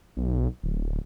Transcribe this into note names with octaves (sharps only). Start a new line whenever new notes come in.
B1
D1